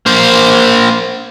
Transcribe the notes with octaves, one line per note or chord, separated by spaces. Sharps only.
A#3 C5